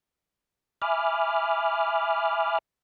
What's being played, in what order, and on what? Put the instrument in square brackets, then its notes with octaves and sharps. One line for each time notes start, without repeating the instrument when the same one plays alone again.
[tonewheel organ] E5 G#5 B5 D6 F6